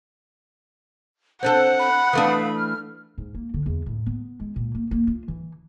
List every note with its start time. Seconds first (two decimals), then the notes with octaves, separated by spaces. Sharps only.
1.43 C4 D4 A4 F#5 F#6
1.79 B5
2.13 E3 A3 D4 B4 F5 D#6
2.56 F6
3.18 G#2
3.35 A#3
3.54 D3
3.66 E2
3.86 A2
4.06 B3
4.40 G#3
4.56 A#2
4.75 A#3
4.91 A#3
5.07 F4
5.28 E3